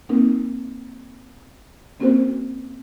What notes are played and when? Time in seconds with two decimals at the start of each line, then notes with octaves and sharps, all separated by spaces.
0.09 A#3 C4 D#4 A#4
2.00 A#3 C4 C#4 F#4 A#4 C5